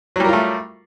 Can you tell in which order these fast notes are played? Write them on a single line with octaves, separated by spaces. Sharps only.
F#3 G3 A#4 F4 A3